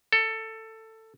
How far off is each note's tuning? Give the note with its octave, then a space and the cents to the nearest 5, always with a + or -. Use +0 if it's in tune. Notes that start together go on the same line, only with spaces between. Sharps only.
A4 +15